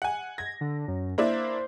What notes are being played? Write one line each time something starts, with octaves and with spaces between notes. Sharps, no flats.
F#5 G#5
G#6 A#6
D3
F#2
A#3 D4 E4 C5